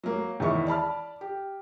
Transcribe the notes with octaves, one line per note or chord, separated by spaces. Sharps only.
F#3 A#3
E2 D#3 C#4 E4 C#6
D5 A5 B5 F6
G4